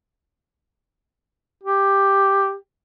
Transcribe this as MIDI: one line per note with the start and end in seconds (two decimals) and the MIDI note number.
1.63 2.55 67